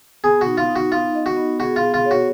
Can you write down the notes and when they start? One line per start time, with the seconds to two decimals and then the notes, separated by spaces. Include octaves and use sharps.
0.24 B3 G#4
0.41 F#4
0.47 D#4
0.58 F4
0.69 D#4
0.76 F#4
0.91 D#4 F4
1.15 D#5
1.26 F#4
1.37 B3
1.59 F#4 G#4
1.76 F4
1.82 G#4
1.94 F4
2.05 C#5
2.11 F#4